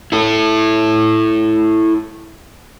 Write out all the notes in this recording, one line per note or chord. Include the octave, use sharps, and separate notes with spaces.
E4 A4